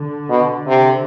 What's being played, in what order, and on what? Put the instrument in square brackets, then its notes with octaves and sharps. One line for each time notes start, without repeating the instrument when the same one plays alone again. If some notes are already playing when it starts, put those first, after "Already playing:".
Already playing: [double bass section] D3
[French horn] B2
C3